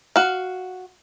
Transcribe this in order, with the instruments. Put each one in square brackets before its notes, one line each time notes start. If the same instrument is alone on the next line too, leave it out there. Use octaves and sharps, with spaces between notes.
[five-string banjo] F#4 F5